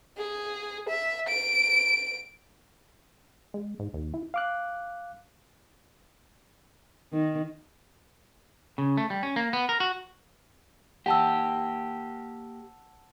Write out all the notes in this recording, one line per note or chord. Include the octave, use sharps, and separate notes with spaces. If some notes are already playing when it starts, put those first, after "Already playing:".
G#4
E5
D7
G#3
G#2
D#2
E4
F5 D6 F#6
D#3
C#3
A3
G3
C#4
A#3
B3
A#4
F#4
A#3 G4 F#5 A5 E6